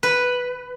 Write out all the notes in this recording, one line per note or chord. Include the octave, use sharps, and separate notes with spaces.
B4